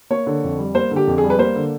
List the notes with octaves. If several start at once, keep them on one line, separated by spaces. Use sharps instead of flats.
A#3 C#5
D3
F2
G3
A#3 C5
D3
G4
F2
G#4
G3
B4
A#3 C5
D3